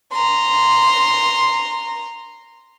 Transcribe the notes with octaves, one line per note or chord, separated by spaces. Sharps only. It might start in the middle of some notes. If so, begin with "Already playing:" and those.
A#5 C6